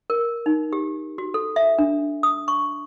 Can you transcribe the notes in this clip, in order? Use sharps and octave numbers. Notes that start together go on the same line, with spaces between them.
A#4
D#4
G4
F#4
A4
E5
D4
D#6
C#6